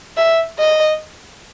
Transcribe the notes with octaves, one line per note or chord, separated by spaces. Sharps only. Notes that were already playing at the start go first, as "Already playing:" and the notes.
E5
D#5